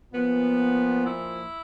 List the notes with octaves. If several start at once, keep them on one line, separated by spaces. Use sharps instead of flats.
A#2 F3 B3
E4